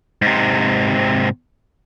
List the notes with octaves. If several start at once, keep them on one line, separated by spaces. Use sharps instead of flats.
G#2 C3